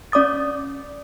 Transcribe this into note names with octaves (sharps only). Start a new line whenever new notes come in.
C#4 D5 D6 D#6 A6